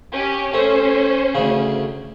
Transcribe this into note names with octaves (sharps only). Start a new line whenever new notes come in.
C#4 G4
A3 C#4 C5
D2 C#3